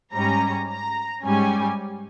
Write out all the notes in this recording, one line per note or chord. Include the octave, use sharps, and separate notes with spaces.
G#2 G3 C#4 A#5
A#5
G#2 G3 C#4 G#5